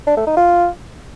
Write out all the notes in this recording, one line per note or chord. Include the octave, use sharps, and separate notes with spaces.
D4
A3
D#4
F4